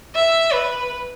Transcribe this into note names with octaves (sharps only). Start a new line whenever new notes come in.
E5
B4